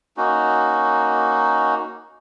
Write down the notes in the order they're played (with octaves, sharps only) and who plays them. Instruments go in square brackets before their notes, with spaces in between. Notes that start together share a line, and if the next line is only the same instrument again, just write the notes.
[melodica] A#3 C#4 D#4 F#4